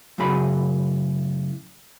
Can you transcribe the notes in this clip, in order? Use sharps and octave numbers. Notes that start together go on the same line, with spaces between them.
F#2 A2 C#3 G#4 B5